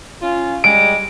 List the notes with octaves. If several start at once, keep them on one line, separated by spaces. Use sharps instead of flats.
C#4 F4
G3 G#3 D7